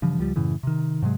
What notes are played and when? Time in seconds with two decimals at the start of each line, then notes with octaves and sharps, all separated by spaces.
0.02 G2 C#3 E3 F3
0.19 C#2 F3 G3
0.36 F#2 A2 C#3 E3
0.63 C3 D#3
1.02 G#2 C3 F#3 G#3